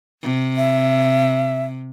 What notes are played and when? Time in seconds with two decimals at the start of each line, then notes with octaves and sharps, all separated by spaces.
0.22 C3
0.56 E5